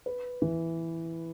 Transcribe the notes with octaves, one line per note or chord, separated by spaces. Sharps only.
B4
E3